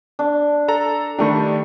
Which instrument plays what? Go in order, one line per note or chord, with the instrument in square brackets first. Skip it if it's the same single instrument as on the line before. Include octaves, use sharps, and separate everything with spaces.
[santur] D4
[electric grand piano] A4 A#5
[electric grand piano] D#3 A3 D4 [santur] G3 A#5 C#6